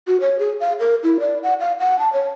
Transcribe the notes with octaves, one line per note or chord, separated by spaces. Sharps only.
F#4
C#5
G#4
F5
A#4
E4
D5
F#5
F5
F#5
A5
C#5